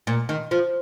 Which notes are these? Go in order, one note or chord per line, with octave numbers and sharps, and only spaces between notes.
A#2
D#3
F3